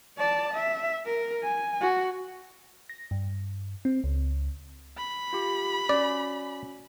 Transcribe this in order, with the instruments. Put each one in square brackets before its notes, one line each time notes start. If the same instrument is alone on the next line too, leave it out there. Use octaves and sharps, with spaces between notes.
[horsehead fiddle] D5 A5
E5
A#4
G#5
F#4
[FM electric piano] A#6
G2
C4
C#2
[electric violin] B5
[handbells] F4 G4
[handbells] C#4 F#4 [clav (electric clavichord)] D5